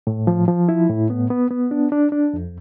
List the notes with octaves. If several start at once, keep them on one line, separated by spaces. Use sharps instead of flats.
A2
F3
F3
E4
A2
B3
B3
B3
D4
D4
D4
F2